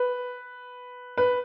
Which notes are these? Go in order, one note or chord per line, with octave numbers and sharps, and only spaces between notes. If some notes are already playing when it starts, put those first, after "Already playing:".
Already playing: B4
B4